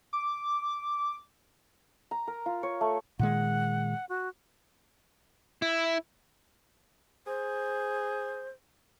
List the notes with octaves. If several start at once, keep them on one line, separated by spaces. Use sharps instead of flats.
D6
A#5
A#4
F4
C#5
A3
A#2 D#3 G#3 F#5
F#4
E4
G#4 C5